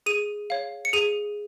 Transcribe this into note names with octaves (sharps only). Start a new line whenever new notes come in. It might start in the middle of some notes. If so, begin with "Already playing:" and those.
G#4 D#7
C#5 F5
C#7
G#4 D#7